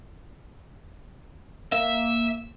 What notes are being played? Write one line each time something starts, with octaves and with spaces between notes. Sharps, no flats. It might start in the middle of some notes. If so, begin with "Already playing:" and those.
A#3 E5